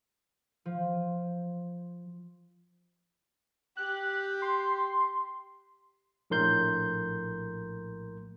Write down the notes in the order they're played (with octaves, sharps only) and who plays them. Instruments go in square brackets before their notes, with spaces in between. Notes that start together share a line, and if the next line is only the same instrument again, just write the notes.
[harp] F3
[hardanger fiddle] G4 [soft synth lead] F#6
[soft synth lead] C6
[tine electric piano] A#1 A2 A#4 C6 G6